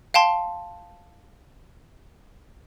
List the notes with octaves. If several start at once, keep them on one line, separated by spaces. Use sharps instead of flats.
F5 G5 A5 C6